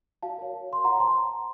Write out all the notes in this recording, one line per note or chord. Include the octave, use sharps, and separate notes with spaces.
F#4 F5 A5
A#4 C#5
F#4
A#4 C#5 C6
F4 F#5 A#5
C5 A5 C6